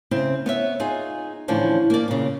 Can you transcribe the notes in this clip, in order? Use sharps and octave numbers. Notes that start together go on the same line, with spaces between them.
C#3 C4 E4
B3 C#5 E5
D#4 F4 G#4 G#5
A2 D3 E3 F3 C#4 D4
A#3 D5
A#2 C#3